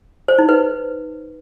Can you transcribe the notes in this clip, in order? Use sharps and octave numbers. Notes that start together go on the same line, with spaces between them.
C5
D#4
B4